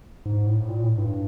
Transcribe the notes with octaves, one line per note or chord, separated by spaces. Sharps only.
G#2
A2
A#2
A2
G2